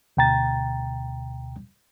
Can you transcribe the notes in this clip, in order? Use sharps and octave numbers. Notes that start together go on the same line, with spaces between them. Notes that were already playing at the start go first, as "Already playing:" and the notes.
D2 B2 G5 A#5 A6